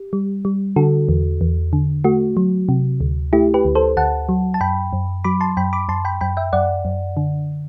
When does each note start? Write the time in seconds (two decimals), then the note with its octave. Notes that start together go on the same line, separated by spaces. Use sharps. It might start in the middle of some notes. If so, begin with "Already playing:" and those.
Already playing: G4
0.13 G3
0.45 G3
0.76 D3 F#4 A4
1.09 E2
1.41 E2
1.73 D3
2.04 A3 F#4
2.37 F#3
2.69 C3
3.01 D2
3.33 A3 E4 G4
3.54 G4 B4
3.65 D2
3.75 A4 C5
3.97 D2 F#5 A5
4.29 F#3
4.54 A5
4.61 F#2 G5 B5
4.93 F#2
5.24 F#3 B5 D6
5.40 A5 C6
5.57 F#2 G5 B5
5.73 B5 D6
5.89 F#2 A5 C6
6.05 G5 B5
6.21 F#2 G5 B5
6.37 E5 G5
6.53 F#2 D5 F#5
6.85 F#2
7.17 D3